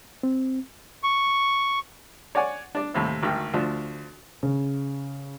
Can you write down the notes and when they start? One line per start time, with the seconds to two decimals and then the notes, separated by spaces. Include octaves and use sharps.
0.23 C4
1.03 C#6
2.35 C#5 D5 F#5 G#5
2.75 D4 D5
2.94 D#2 A2 C3
3.22 G#1 D2 D#3 G5
3.54 D2 F3 D4
4.43 C#3